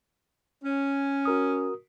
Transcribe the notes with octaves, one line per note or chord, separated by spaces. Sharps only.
C#4
F#4 A#4 D#6